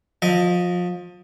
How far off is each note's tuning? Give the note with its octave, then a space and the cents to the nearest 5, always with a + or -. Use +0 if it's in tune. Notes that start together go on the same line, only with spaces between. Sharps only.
F3 +25 D#5 +0